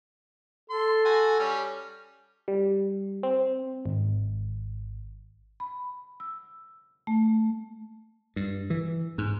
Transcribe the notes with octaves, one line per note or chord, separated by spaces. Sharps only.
A4 C6
F#4 G#5
G3 C#4
G3
C4
G#1
B5
E6
A3
G2
E3
G#2